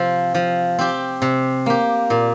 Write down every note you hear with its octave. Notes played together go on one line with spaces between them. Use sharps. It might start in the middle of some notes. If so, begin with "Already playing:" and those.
Already playing: C3 F3 C4
F3
C4 G4
C3
A#3 G4
A#2